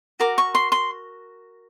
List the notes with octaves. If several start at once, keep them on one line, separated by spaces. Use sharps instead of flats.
F#4 A#4 D6
C#6
C6
C6